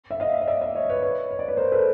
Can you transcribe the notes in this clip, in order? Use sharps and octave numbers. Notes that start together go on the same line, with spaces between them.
E5
D#5 F5
D#5
D5 E5
D5 E5
C#5 D#5
B4 C#5
B4 C#5
C#5
D5
B4 C#5
A#4 C5
A4 B4